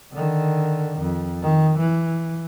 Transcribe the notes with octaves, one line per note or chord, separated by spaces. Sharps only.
D3 D#3
F2
D#3
E3